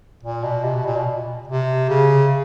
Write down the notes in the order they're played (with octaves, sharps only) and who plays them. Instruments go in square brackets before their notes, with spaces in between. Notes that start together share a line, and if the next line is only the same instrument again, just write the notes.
[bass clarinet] A#2
B2
C3
B2
A#2
B2
C3
C#3